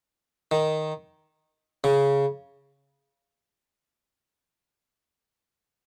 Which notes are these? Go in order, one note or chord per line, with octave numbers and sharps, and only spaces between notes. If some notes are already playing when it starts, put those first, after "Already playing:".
D#3
C#3